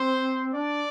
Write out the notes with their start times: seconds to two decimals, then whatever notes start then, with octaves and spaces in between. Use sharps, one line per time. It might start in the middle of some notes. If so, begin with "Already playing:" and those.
Already playing: C4 C5
0.54 D4 D5